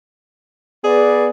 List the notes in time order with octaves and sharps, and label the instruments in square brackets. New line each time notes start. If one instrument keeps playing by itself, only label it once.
[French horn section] B3 B4 D5 [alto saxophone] G#4